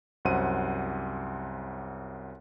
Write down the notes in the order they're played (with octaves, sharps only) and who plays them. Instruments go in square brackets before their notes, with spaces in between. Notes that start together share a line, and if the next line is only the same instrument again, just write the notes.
[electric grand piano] C2 F#2 C5 F#5 D#7